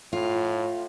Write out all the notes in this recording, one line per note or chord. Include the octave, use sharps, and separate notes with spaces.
A2 F4